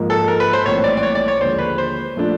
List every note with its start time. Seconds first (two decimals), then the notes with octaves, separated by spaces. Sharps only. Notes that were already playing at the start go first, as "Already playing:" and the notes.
Already playing: G#2 F3 A#3
0.10 A4
0.28 A#4
0.40 B4
0.53 C5
0.66 A#1 A2 E3 G3 C4 C#5
0.84 D5
0.97 D5
1.03 C#5
1.15 D5
1.28 C#5
1.40 D#2 D3 F3 G#3 C5
1.59 B4
1.78 C5
2.16 A#2 F3 A3 D4